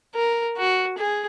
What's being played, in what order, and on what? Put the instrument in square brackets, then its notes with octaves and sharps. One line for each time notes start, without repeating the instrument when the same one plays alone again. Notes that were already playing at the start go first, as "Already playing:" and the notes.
[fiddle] A#4
F#4
G#4